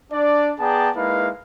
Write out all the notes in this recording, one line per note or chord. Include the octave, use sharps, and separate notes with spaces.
D4 D5
B3 G#4 D5 G5 A5 A#5
G#3 A#3 D#4 E4 B4 F5